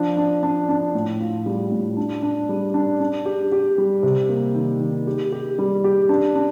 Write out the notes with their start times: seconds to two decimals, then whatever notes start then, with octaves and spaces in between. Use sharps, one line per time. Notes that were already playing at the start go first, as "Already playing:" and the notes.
Already playing: F3 D4
0.17 D4
0.43 D4
0.69 D4
0.95 A2
1.21 F4
1.46 G3
1.72 A2
1.97 D4
2.23 D4
2.49 G3
2.74 D4
3.00 D4
3.25 G4
3.52 G4
3.78 G3
4.03 C3
4.29 A#3
4.55 D#3
4.80 D#3
5.07 G4
5.32 G4
5.59 G3
5.84 G4
6.09 D4
6.35 D4